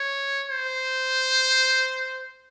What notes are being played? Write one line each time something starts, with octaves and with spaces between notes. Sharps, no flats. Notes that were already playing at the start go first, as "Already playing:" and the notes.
Already playing: C#5
C5